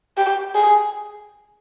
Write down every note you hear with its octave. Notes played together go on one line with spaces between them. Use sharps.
G4
G#4